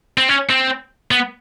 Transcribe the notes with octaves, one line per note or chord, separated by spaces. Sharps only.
C4
C#4
C4
B3